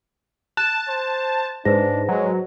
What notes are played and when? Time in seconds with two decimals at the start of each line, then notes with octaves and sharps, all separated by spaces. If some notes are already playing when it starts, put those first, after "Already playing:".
0.57 A5 F#6 E7
0.88 C5
1.65 G#2 D4 B4 C5 A#6
2.09 F#3 G#3